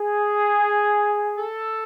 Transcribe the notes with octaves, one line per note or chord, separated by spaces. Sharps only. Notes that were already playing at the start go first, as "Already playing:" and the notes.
Already playing: G#4
A4